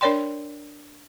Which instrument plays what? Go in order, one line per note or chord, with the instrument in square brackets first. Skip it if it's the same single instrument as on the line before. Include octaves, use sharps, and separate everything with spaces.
[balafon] D4 A#4 C#5 D5 G5 C6